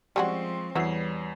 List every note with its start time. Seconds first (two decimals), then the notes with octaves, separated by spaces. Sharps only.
0.16 F3 G3 G#3 C4 C#4 F#4 C6 C#6
0.75 E2 E3 G3 E4 F#4 C#5 C7